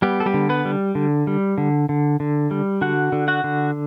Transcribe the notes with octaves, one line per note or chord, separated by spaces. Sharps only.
G3 B3 G4
A4
G3 G4
D3
B3 B4
G3
D3
G3
D3
D3
D3
G3
D3 F#4 F#5
D3
F#4 F#5
D3